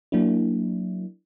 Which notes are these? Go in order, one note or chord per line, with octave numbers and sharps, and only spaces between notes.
F#3 A#3 D4 E4